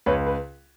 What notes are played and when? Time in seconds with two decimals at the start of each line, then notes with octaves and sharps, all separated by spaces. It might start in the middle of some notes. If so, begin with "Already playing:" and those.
0.06 C#2 B4 C#5
0.27 B4